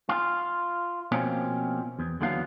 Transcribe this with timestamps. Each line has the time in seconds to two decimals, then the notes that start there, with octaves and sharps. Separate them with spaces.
0.09 F4
1.12 B2 F3 A#3 C4 C#4
1.99 E2
2.20 D#2 D3 E3 F#3 B3 F5